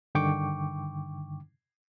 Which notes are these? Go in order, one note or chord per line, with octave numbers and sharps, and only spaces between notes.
G2 D3 D#3 G5 C#6 D6